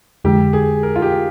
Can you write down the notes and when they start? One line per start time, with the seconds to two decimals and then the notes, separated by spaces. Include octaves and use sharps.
0.24 F2 D3 G#3 G4
0.53 G#4
0.83 A#4
0.96 F4
1.02 G4